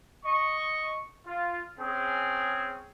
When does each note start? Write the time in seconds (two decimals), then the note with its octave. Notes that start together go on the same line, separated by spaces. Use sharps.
0.25 D#5 C#6
1.26 F4
1.79 C4 C#4 G#4